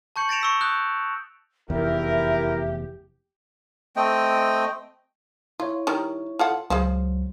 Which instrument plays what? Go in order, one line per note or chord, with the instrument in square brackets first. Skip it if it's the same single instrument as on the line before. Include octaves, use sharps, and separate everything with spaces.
[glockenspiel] A5 C#6 G6 C#7 F#7
A6 A#6 C#7 D7 E7 F7
C#6 E6 B6
D#6 F#6 G6
[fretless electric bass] F1 E2 [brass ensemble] E4 A#4 [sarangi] G4 [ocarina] E5
[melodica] A3 C4 D#5 G5
[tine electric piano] E4 C#5 [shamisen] F4
[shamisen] D#3 G3 A#4
F4 A4 F#5
[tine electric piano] C#2 F#3 [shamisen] F3 G#4